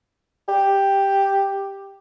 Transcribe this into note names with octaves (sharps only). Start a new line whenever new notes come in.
G4